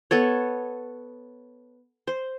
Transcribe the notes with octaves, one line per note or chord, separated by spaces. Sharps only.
B3 A4 C#5
C5